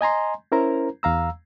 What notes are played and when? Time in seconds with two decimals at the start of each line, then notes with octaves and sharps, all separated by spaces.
0.01 D#5 G#5 A#5 C6
0.52 C#4 E4 A#4 C5 A#5
1.03 E2 F5 A#5 E6